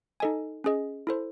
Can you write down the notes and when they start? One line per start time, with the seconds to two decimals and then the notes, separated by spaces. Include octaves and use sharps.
0.20 D#4 A4 D#5 G#5
0.64 C#4 G#4 D#5
1.07 E4 A4 C5